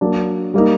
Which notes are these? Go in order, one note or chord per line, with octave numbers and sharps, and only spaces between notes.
F#3 A#3 D4
G3 A#3 D#4